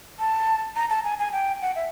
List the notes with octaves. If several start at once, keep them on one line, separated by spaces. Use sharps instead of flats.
A5
A#5
A5
G#5
G#5
G5
F#5
E5